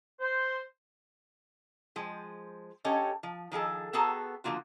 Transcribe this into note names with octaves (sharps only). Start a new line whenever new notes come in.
C5
F3 G#3
C#4 G4 A4 C#5 D#5
F3
D#3 F3 G#4 A4
B3 F#4 G#4 A4 A5 A#5
D3 F3 A#3 F4 F#4